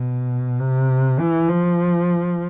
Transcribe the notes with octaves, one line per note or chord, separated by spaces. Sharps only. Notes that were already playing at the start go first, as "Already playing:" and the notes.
Already playing: B2
C3
E3
F3